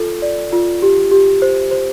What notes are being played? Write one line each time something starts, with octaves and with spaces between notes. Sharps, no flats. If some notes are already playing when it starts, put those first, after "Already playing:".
Already playing: F4 A4
D5
F4
G4
G4
C5
C5